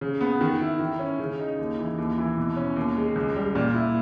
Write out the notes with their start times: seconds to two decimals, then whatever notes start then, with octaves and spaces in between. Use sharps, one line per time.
0.01 C#3
0.21 B3
0.41 D#3
0.61 E4
0.80 D#3
0.99 C#4
1.19 C#3
1.39 D#4
1.58 D#2
1.79 E3
1.98 D#2
2.18 E3
2.37 B2
2.56 C#4
2.76 D#2
2.97 G#3
3.15 C#2
3.36 G3
3.55 A#2
3.74 E4